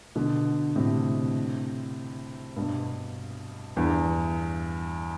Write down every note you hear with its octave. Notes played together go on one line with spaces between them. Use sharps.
B2 D3
A2 C3
G2 B2
E2 G2